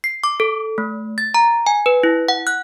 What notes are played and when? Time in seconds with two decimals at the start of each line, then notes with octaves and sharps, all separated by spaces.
0.04 C7
0.24 D6
0.40 A4
0.78 A3
1.18 A6
1.34 A#5
1.67 G#5
1.86 B4
2.03 E4
2.28 F#5
2.47 F#6